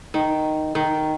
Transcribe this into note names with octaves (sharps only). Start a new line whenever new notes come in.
D#3
D#3